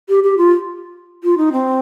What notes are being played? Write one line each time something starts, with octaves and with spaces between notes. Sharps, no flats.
G4
G4
F4
F4
D#4
C4